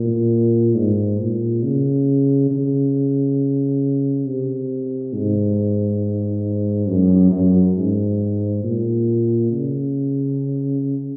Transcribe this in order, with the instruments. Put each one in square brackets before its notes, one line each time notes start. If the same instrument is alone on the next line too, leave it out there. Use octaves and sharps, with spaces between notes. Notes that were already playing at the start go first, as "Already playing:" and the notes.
Already playing: [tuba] A#2
G#2
A#2
C#3
C#3
C3
G#2
F#2
F#2
G#2
A#2
C#3